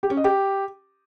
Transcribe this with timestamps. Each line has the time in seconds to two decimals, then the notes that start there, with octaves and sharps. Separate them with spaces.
0.03 G4
0.10 C#4
0.17 D#5
0.24 G4